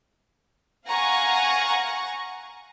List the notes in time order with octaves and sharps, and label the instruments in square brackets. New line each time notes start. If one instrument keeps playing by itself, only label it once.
[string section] F5 F#5 G#5 A#5 C#6